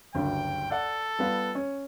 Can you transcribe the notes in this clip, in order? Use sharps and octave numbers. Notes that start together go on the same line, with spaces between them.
F#1 D2 G2 G5
A4 D5 F#5
G3 B3 F4
C#4